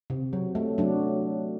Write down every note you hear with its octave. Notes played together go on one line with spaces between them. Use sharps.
C3
F#3
A3
F#3 D4